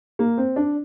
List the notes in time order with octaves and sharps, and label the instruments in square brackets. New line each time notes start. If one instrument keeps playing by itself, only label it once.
[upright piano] A#3
C4
D4